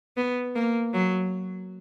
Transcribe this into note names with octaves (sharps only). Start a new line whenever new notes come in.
B3
A#3
F#3